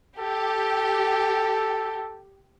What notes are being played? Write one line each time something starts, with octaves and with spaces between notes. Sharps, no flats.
G4 A4